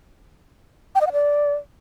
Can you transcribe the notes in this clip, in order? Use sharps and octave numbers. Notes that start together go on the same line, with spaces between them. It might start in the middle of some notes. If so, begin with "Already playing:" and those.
G5
D#5
F#5
D5